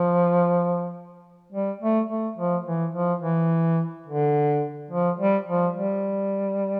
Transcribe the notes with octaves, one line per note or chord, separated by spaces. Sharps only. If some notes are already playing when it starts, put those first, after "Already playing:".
Already playing: F3
G3
A3
A3
F3
E3
F3
E3
D3
F3
G3
F3
G3